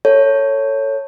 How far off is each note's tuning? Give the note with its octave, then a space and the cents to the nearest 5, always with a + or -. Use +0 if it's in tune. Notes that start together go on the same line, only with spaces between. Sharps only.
A4 +20 C#5 +0